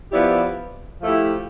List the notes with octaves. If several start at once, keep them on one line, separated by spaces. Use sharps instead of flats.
F3 B3 E4 G4 D5
F3 A3 E4 G4